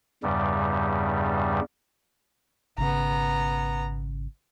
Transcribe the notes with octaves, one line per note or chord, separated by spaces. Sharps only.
E2 G2 C#3 G3
G#1 C#3 B3 A#5